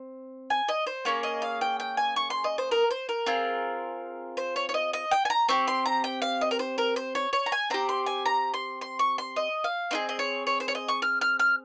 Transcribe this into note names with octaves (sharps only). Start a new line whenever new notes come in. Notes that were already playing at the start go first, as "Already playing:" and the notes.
Already playing: C4
G#5
D#5
C5
A#3 C#4 G#4 C#5
D#5
F5
G5
G5
G#5
C#6
C6
D#5
C5
A#4
C5
A#4
C4 F4 G#4
C5
C#5
C#5
D#5
D#5
G5
G#5
A#5
C4 G4 C#6
C6
A#5
G5
F5
D#5
A#4
C5
A#4
C5
C#5
C#5
A#5
G#5
C4 G4 A#5
C6
G#5
A#5
C6
C6
C#6
C6
D#5
F5
C4 D#4 G#4 D#5
D#5
C#5
C#5
C5
C#5
D#5
C#6
F6
F6
F6